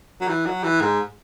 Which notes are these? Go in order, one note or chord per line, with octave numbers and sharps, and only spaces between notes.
F#3
E3
F#3
E3
G#2